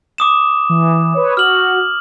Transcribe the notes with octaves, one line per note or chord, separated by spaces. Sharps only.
D6 D#6 E7
E3
B4 C#5
F#4 F6 F#7